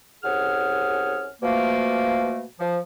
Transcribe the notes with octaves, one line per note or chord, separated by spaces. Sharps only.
C2 C#4 G#4 F#5 F6
B2 F3 A3 A#3
F3